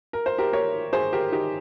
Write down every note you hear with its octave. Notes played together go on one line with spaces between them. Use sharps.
A#4
C5
G4 A#4
A#4 C#5
G#4 C5
G4 A#4
D#4 G4